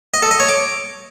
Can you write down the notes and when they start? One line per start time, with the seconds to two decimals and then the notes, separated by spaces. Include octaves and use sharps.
0.14 D#5
0.22 A4
0.31 D#5
0.40 C#5
0.48 D6